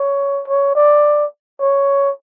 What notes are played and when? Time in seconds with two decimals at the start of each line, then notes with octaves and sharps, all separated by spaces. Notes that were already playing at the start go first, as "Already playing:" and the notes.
Already playing: C#5
0.48 C#5
0.75 D5
1.60 C#5